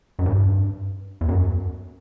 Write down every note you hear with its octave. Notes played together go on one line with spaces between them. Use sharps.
F#2
G2
E2
F#2